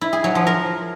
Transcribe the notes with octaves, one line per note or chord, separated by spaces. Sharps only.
E4
G#4
F#3
F3
A#4